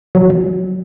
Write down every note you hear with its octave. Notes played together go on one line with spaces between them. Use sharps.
F#3
F#3